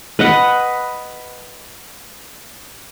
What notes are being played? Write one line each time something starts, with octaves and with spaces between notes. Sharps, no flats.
B4 D#5 F#5